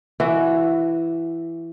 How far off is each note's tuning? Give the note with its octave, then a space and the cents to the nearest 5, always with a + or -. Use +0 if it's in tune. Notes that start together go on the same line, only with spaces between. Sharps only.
E3 +15 F#4 +0 E5 +0